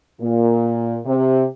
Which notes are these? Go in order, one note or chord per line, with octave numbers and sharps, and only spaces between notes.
A#2
C3